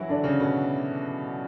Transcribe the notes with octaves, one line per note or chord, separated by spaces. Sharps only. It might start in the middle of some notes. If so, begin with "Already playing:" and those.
Already playing: E3 F#3 E4 F#4
D3 D4
C#3 C#4
B2 B3